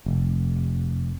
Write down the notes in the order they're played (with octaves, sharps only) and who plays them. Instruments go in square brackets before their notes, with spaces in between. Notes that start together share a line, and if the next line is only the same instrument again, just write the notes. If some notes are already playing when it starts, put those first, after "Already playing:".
[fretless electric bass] F1